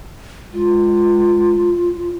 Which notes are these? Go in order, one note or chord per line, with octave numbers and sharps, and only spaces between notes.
G#3 F4